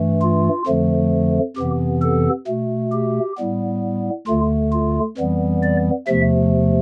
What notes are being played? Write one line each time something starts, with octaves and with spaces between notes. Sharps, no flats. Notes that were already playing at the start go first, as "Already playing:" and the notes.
Already playing: G2 E3 A3
F4
F2 D3 F3 A3
F2 C3 E3 B3 G4
A4
B2 A3
G4
A2 G3 B3
D2 D3 A3 F4
F4
F2 E3 G3 B3
D5
E2 C3 F3 A3 E5